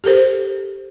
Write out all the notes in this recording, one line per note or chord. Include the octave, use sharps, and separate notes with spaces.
G4 A4 A#4 C5